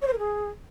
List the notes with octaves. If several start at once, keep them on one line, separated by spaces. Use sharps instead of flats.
C#5
C5
A#4
G#4